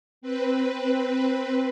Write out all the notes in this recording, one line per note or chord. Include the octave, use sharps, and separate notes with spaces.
C4 B4